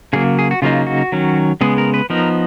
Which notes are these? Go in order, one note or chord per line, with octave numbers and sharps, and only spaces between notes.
C#3 F#3 A#3 G#4
G#4
F#4
C#3 F#3 A#3 D#4 F4
F#4
D#3 F#3 C#4
C#3 G#3 B3 G#4
A#4
B4
F3 B3 D#4 A#4